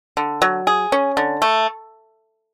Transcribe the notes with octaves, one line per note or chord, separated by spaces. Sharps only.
D3
F#3
G#4
C#4
D3
A3